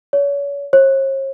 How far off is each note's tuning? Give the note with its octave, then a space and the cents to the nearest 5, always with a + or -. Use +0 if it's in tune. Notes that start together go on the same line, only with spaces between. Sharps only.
C#5 +35
C#5 -45